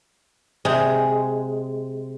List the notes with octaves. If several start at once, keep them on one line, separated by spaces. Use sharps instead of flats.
C3 G#3